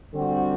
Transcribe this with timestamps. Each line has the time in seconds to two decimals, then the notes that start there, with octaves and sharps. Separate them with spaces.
0.14 D3 G3 C4 F#4